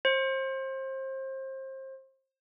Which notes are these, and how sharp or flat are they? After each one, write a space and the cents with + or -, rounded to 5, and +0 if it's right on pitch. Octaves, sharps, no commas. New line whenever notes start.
C5 +30